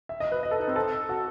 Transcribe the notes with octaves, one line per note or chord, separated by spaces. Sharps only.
E5
D#5
B4
D#5
A4
D#4
C4
A4
F#4